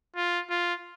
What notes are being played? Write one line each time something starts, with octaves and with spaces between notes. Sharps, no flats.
F4
F4